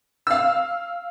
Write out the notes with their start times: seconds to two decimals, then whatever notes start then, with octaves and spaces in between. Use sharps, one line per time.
0.27 F5 E6